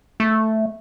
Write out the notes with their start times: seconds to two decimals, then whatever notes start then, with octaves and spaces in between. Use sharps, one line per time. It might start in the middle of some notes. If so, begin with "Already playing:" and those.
0.20 A3